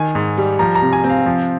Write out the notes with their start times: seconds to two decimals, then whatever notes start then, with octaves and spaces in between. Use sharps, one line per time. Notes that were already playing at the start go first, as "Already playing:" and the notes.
Already playing: D#3 G#5
0.15 G#2
0.37 G3
0.59 F3 A#5
0.75 A#5
0.82 C3
0.93 G#5
1.04 C4
1.10 F5
1.26 F3